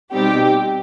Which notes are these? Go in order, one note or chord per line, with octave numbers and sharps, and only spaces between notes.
B2 G3 C4 D#4 G4